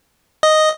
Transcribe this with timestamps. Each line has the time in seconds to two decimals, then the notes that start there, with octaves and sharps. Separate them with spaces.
0.43 D#5